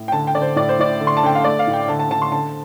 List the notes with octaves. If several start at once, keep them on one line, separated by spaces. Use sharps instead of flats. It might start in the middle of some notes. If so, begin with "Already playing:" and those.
Already playing: A2
G5
D3 A5
G5
D3 D5
C5
A2 D5
C5
A2 D5
D3
C6
A5
D3 G5
F5
A3 D5
F5
A2
G5
D3 A5
A5
D3 A5
C6
D3 A5